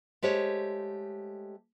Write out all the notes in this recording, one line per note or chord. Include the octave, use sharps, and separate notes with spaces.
G#3 A3 G4 C5 C#5